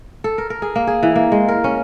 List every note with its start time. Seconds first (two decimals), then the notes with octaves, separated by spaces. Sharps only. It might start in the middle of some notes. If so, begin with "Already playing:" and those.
0.24 A4
0.38 A#4
0.50 A#4
0.62 G#4
0.76 A#3
0.87 G#4
1.03 E3
1.15 A#3
1.32 G#3
1.48 A#4
1.64 C#4